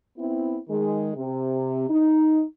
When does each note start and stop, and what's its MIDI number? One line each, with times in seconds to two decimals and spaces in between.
0.18 0.58 59
0.18 0.58 60
0.18 0.58 64
0.69 1.11 51
0.69 1.11 56
1.15 1.86 48
1.90 2.42 63